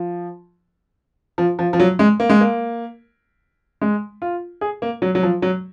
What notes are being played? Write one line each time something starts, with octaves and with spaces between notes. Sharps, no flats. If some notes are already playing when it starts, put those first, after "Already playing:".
Already playing: F3
F3
F3
F3
F#3
G#3
A#3
G#3
A#3
G#3
F4
G#4
A#3
F#3
F#3
F3
F#3